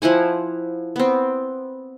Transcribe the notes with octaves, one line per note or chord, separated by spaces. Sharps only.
F3 E4 F#5 G#5
B3 C4